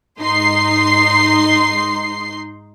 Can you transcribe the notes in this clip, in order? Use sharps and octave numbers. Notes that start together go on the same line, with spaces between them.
G#2 D#4 C6 C7